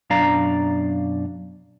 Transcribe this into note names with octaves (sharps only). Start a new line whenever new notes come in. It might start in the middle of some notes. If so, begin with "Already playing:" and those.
F#2 B2 D4 D5 F5 A#5